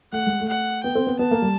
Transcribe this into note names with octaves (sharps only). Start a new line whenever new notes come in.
A3 F#5
G#3
A3
F#5
B3 G5
C4
B3
B3 A5
A#3
G3